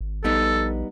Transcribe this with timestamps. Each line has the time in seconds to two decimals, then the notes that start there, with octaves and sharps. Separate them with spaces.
0.01 G#1
0.24 A#1 G3 B3 D#4 A4